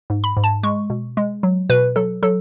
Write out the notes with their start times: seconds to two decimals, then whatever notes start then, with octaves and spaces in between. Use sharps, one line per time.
0.10 G#2
0.24 B5
0.37 G#2
0.44 A5
0.63 G#3 C#6
0.90 B2
1.17 G#3
1.43 F#3
1.69 B2 B4
1.96 F#3 A4
2.23 F#3 A4